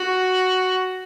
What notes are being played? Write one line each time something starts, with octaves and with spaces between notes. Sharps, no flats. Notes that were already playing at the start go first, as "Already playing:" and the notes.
Already playing: F#4